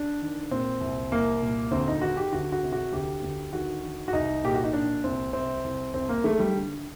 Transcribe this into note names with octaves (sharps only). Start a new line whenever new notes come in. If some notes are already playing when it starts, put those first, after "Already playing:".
Already playing: D4
D#3
A#2 C4
C2
C2 A#3
A#2
D2 C4
D#4
D#3 F#4
G4
D2 F#4
F#4
C3
F#4
D2 G4
D2
D#3 F#4
D#3
F#4
C2 D#4
A#2 G4
F#4
D#4
A#2 D4
C2 C4
C3 C4
C2
C2 C4
A#3
D#3 A3
G3
D3